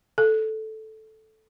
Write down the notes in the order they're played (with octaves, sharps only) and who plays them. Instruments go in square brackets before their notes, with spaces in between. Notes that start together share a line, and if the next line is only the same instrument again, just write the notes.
[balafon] A4